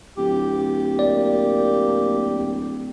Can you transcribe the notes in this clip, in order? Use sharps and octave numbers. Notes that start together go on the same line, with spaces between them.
D1 G4
A#3 D5